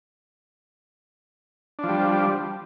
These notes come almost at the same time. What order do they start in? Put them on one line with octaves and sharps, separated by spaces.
D4 F3 G3